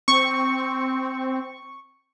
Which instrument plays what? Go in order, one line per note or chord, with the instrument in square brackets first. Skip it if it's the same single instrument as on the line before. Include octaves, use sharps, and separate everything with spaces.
[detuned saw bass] C4 [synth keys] C#6